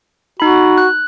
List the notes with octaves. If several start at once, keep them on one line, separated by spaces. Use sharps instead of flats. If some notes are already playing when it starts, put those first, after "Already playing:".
D#4 F#4 B5
F#6